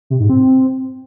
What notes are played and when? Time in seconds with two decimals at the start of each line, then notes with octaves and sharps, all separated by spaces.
0.10 C3
0.20 G#2
0.29 C4